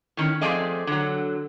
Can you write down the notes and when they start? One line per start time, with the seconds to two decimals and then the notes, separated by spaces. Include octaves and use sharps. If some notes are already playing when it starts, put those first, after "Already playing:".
0.17 A2 D#3 C#4
0.41 F3 A3 C4 G#4 D5 D#5
0.87 D3 F#3